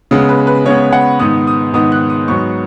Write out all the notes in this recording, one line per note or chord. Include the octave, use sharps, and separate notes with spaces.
C#3 G#3 B3
B4
B4
C#3 G#3 B3 C#5
F#5
G#2 D#3 B3 D#6
D#6
G#2 D#3 B3 D#6
F#6
D#6
G#2 F#3 B3 C#6